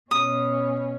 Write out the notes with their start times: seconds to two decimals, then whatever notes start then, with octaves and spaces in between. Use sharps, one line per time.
0.11 B2 C#4 D#6